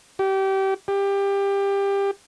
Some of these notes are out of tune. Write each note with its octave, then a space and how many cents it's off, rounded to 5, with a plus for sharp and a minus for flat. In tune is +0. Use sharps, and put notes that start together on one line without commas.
G4 -25
G4 +20